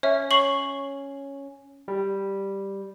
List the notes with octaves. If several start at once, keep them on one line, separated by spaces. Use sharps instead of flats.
C#4 C#5 E5
C#6 C7 F#7
G3